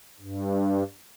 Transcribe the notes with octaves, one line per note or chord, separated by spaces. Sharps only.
G2